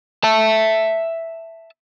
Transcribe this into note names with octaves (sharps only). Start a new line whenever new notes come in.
E5 A5